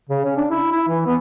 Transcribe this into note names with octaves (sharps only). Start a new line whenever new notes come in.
C#3
C#4
D4
E4
E4
E3
B3